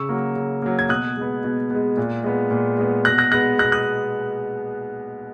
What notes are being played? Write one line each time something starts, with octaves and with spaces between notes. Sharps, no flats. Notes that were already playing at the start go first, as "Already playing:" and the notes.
Already playing: C#3 C#6 E6
F#3 A#3
C#3
F#3 A#3
G#6
B2 D#6 F#6
G#3 B3
B2
G#3 B3
A#2
G#3 B3
A#2
G#3 B3
B2 F#6 A#6
F#6 A#6
G#3 B3 F#6 A#6
B2 F#6 A#6
D#6 F#6